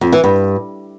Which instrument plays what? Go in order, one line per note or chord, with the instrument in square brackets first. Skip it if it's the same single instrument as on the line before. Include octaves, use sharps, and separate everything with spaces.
[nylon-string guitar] F2
E3
G2